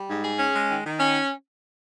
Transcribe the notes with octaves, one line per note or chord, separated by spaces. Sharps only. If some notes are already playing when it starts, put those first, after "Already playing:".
Already playing: G3
G#2
G#4
C#4
G#3
D#3
D#3
C#4